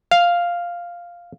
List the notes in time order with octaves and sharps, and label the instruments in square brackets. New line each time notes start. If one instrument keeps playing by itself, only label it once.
[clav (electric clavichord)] F5